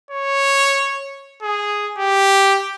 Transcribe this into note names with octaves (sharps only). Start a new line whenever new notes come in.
C#5
G#4
G4